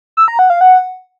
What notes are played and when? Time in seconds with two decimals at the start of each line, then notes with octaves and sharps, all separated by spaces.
0.17 E6
0.28 A#5
0.39 F#5
0.50 F5
0.61 F#5